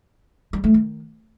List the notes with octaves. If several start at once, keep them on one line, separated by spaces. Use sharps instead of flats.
G3
A3
D#3